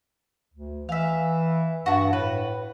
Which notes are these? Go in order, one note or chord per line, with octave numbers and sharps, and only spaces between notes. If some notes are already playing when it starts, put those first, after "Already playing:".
D2
E3 E5 F5
G2 F#4 A5
A2 B4